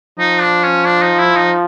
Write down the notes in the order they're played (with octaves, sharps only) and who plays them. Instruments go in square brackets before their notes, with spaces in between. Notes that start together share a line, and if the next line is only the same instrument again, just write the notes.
[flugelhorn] F3 [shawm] D#4
[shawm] D4
C#4
D4
D#4
E4
D#4